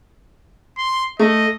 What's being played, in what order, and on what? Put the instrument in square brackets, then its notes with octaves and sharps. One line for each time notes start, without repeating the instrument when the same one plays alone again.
[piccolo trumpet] C6
[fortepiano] A3 [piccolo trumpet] D#5